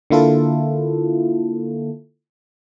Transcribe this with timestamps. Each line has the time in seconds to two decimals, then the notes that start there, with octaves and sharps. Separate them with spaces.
0.10 D3 A#3 E4 F4 A4